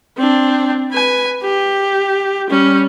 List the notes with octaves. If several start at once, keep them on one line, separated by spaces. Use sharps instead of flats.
C4 D4
B4 G#5
G4
G3 C#4